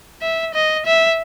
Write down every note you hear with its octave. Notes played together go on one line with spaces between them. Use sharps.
E5
D#5
E5